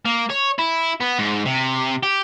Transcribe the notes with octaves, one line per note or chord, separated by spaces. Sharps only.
A#3
C#5
E4
B3
G#2
C3
G4